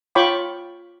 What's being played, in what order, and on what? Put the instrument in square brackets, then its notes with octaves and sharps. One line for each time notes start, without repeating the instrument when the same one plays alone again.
[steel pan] F4 C#5 G5 B5 C#6 D6